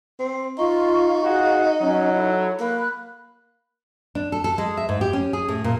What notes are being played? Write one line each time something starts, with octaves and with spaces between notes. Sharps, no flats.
C4
D#4 F4 F5 C#6
F#4 G#4 D#5 F5
F#3 C#4
E4 A4
A#3 B5 F#6
D4
A4
A4
G#3
E5
G#2
G4
C#4
G#4
A2
A#2